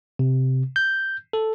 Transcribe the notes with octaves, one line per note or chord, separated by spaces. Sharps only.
C3
G6
A4